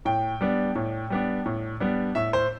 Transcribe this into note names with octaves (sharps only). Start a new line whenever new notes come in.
A2 G5
G3 B3 D4
A2
G3 B3 D4
A2
G3 B3 D4
A2 E5
C5